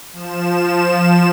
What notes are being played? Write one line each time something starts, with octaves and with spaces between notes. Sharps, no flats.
F3 E7